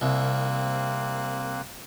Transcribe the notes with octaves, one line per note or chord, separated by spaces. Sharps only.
C2 A#3 C4 F#6